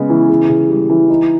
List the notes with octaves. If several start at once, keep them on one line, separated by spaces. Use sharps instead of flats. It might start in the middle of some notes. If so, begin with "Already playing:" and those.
Already playing: C#3 G#3 B3
E3
C#3
C#3
G3
E3
D#4